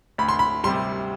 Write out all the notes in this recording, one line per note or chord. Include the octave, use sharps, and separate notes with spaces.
D2 B5
C6
B5
C3 G3 C6